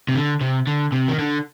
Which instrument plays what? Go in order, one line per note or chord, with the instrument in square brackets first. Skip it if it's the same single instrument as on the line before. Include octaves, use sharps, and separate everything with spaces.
[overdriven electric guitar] C3
D3
C3
D3
C3
D#3
D3